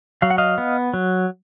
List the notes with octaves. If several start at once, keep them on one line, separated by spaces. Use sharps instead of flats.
F#3 F5
F#5
D#5 F5
B3
F#3